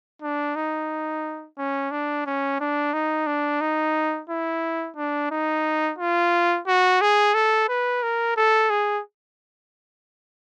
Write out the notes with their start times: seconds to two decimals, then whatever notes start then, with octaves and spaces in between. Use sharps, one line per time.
0.22 D4
0.56 D#4
1.58 C#4
1.91 D4
2.26 C#4
2.60 D4
2.93 D#4
3.27 D4
3.61 D#4
4.29 E4
4.97 D4
5.31 D#4
5.99 F4
6.67 F#4
7.01 G#4
7.34 A4
7.69 B4
8.03 A#4
8.37 A4
8.70 G#4